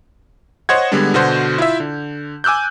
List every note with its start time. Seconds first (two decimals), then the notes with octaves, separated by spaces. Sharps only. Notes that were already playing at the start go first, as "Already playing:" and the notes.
0.69 C5 C#5 D#5 F#5 G#6
0.92 D3 G3 G#3 B3 D4
1.14 B2 D3 F#4 C5 G6
1.58 E4 F4 E5
1.80 D3
2.44 G#5 D6 E6 F#6 G6